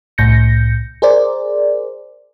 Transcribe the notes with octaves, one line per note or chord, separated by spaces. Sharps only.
C2 A2 G6 A#6 C#7
G#4 A#4 C5 D5